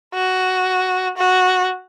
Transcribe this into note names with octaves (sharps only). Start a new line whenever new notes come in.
F#4
F#4